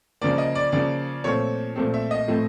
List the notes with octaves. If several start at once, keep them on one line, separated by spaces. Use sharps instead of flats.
C#3 F3 A#3 D5
D#5
D5
C#3 F3 A#3 D5
A#2 F3 A3 C4 C#5
A#2 F3 A3 C4
E5
D#5
A2 F3 A3 C4